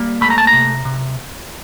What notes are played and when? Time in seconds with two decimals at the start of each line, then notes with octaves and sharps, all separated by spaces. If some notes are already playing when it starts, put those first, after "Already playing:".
Already playing: G3 A#3
0.21 A3 B5
0.30 A#5
0.38 A5
0.47 A#5
0.53 C3
0.85 C3